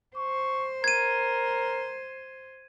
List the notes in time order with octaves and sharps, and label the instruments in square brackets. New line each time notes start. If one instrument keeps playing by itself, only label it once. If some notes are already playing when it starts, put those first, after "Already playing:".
[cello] C5 [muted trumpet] C#6
[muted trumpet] A#4 [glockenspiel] G#6 D#7